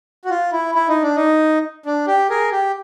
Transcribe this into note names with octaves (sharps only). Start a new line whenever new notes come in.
F#4
F4
E4
E4
D#4
D4
D#4
D4
G4
G#4 A#4
G4